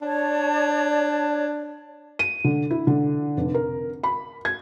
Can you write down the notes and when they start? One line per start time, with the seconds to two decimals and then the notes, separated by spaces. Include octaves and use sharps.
0.02 D4 C#5 D5 A5
2.19 D#7
2.44 D3
2.71 E4
2.87 D3
3.37 F1
3.54 A#4
4.03 B5
4.45 G#6